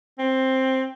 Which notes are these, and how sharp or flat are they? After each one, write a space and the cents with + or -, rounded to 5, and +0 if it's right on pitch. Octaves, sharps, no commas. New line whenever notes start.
C4 +10